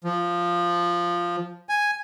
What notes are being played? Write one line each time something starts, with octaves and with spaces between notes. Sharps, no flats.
F3
G#5